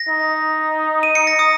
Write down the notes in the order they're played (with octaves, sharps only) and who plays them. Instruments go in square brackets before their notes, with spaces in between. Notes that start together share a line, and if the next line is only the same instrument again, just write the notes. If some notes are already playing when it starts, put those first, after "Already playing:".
Already playing: [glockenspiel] A#6
[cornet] D#4
[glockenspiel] D#7
C#7
A#6
D#6